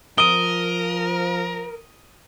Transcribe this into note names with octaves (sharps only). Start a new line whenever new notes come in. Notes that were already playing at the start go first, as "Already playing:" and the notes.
F3 A#4 D#6 D#7 G7